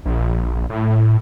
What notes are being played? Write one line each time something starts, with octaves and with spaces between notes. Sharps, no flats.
A#1
A2